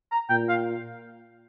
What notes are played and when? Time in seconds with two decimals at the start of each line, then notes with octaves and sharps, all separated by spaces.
0.12 A#5
0.30 A#2 G5
0.49 F5